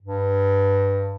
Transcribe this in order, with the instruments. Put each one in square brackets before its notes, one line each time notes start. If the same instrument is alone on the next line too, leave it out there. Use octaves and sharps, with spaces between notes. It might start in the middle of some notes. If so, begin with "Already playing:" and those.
[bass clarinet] G2